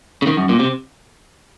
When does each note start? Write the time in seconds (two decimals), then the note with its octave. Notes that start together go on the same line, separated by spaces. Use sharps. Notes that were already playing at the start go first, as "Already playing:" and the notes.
0.22 C#3
0.27 D#3
0.37 F#2
0.49 A#2
0.59 C3